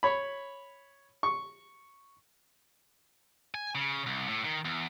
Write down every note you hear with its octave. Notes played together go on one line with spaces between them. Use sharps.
C#5 B5
C#6
G#5
C#3
C2
A2
D#3
E2